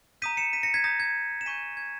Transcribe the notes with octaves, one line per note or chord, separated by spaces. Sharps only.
A#5 D#6 G6 B6 D#7
C#7 E7
B6 D#7
A#6 C#7
G#6 B6
A#5 D#6 G6 A#6
G#6
E7
G#5 C#6 G6 B6 D#7
G#6